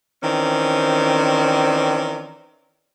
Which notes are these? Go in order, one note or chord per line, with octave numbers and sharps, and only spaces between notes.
D#3 E3 C4 C#4 D5